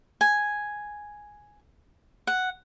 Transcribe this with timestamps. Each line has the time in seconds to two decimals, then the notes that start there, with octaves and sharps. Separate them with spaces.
0.21 G#5
2.27 F#5